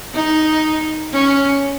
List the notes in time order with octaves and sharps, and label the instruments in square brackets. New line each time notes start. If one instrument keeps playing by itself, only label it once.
[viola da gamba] D#4
C#4